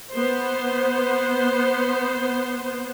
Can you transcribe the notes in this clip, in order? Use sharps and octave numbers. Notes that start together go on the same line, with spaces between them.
B3 C5